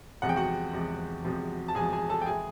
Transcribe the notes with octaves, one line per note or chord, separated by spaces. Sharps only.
E2 C3 F3 G#3 F#5
G5
F#4 F#5
E2 C3 F3 G#3
E2 C3 F3 G#3
A5
E2 C3 F3 G#3 G#4 G#5
G#4 G#5
A4 A5
G5
E3 G#3 G#4 G#5